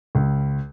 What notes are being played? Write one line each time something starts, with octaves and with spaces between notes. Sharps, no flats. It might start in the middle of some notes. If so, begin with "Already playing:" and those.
C#2